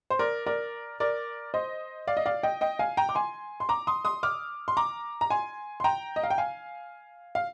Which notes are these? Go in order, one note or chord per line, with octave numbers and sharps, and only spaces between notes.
C5
A#4 D5
A#4 D5
A#4 D5
C5 D#5
D5 F5
D#5
D5 F5
D#5 G5
D#5 G5
F5 G#5
G5 A#5
D6
G#5 C6
C6
A#5 D6
C6 D#6
C6 D#6
D6 F6
C6
A#5 D6
A#5
G#5 C6
C6
G5 A#5
D#5
F5
G5
F5 G#5
F5